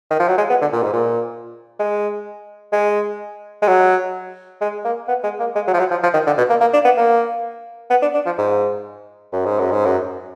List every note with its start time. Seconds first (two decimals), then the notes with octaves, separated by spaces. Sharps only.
0.10 D#3
0.20 F3
0.28 F#3
0.38 G#3
0.50 B3
0.61 D3
0.73 A#2
0.83 G#2
0.93 A#2
1.79 G#3
2.72 G#3
3.62 G#3
3.68 F#3
4.61 G#3
4.85 A#3
5.08 B3
5.23 G#3
5.39 A#3
5.55 G#3
5.67 F#3
5.74 F3
5.79 F#3
5.91 F3
6.03 F3
6.14 D#3
6.27 D3
6.37 B2
6.49 A#3
6.61 A#3
6.73 D4
6.84 B3
6.97 A#3
7.90 B3
8.02 D4
8.14 D4
8.26 F3
8.38 G#2
9.32 F#2
9.46 G#2
9.59 F#2
9.72 G#2
9.85 F#2